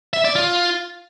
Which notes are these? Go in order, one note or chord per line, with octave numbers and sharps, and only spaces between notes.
E5
D5
F4